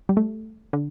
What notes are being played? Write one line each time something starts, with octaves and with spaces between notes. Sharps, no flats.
G3
A3
D3